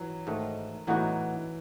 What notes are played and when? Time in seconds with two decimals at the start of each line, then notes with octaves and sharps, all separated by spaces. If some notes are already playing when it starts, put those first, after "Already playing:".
Already playing: E3 F#3
0.27 G#2 D#3 A3
0.87 A2 E3 F#3 B3 D#4 F#4